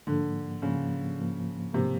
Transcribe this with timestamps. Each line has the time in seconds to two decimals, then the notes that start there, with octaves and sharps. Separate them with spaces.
0.07 G#2 D3 F3 A#3
0.62 G#2 C#3 F3 A#3
1.19 G#2 F3 A#3
1.73 G#2 C3 F3 A#3